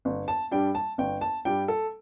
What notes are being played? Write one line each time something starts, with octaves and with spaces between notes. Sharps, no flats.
G1
A5
G2 G3 D4 G5
A5
G1 G5
A5
G2 G3 D4 G5
A4